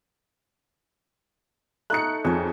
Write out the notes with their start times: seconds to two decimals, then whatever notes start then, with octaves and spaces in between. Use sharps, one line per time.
1.90 A3 D#4 F#6 C#7
2.25 F2 G#4 C#5